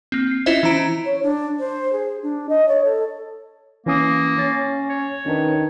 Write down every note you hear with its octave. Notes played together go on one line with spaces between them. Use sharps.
A#3 C4
C7
C#4 E4 F4 C5 D#5 E5
E3 C#4 E4 A#5 D7
C#5
D4
C5
G#4
D4
D#5
C#5
A4
E3 A#3 C#4 D#6
C#4 A6
C#5
D#3 C#4 D4 B4